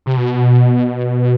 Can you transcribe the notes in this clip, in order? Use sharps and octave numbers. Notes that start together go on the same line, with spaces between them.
C3
B2